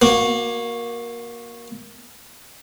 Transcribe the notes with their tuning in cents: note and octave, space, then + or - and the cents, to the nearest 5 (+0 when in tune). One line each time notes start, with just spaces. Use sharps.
A#3 +15 F#4 -10